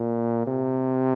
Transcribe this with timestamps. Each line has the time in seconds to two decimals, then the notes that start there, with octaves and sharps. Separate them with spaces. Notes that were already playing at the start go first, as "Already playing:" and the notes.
Already playing: A#2
0.47 C3